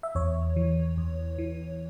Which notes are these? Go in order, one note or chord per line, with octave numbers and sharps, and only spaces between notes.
E5
E2 C#5
E3
E2
E3